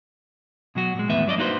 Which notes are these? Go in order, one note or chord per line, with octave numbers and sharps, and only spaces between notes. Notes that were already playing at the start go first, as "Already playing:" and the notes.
B2 F#3 F#4
A#2 G#3
E2 A2 D#3 B3 B4 E5
G2 F#3 D5 D#5
A#3 D#4 F#4 B4 C5